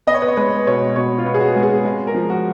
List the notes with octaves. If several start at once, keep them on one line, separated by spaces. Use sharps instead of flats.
B3 D#5
C#5
B4
C#5
G#3 B4
B2 C#5
B2 C#5
F4
B3
G#4
F#4
G#3
G#4
G#3
A#4
F3
F#4